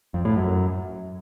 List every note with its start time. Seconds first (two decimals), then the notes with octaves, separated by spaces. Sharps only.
0.14 F2
0.25 A2
0.36 F#2